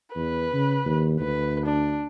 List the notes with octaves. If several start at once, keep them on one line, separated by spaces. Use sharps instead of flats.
E2 B4
C#3
D#2
D2 B4
D4